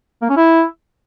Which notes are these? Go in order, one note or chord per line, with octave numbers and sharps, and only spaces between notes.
A#3
C#4
E4